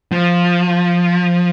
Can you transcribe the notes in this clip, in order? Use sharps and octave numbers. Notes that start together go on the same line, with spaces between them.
F3